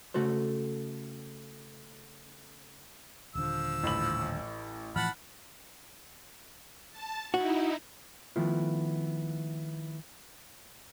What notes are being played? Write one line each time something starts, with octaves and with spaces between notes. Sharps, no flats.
C#3 A3 F#4 A4 C5
D#1 D3 F3 E6
A1 B5 F#7
A2 E3 F3 F#5 A5 B5 F6
A5
D#4 E4 F#4
D#3 F3 A3 B3 E4 F4